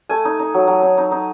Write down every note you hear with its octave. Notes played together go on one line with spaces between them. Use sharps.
A3 G#5
D#4
D#4
F#3
F#3
D#4
D#4
D#4